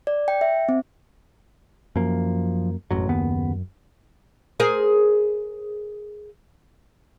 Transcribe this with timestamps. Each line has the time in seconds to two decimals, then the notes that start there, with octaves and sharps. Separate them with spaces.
0.07 D5
0.28 G5
0.41 E5
0.69 C4
1.96 F#2 F3 A#3
2.91 E1 A1 F#2 F#3
3.09 F#1 D#2 B3
4.60 G#4 A#4 C5